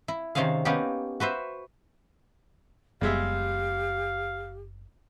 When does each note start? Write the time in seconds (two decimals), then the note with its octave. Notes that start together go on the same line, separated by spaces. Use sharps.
0.08 E4
0.35 C3 D#3 C4 C#4 G#4 F5
0.65 A#3 B3 C#4 D#4 G4
1.20 F#4 B4 C5 E5
3.01 F#1 G3 G#3 B3 G4 E5 F5